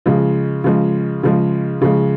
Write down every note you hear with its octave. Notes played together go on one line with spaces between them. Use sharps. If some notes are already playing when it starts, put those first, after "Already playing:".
C#3 F3 G#3
C#3 F3 G#3
C#3 F3 G#3
C#3 F3 G#3